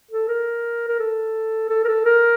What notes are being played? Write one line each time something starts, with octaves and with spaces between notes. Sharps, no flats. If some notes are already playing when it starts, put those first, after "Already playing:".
A4
A#4
A#4
A4
A4
A#4
A4
A#4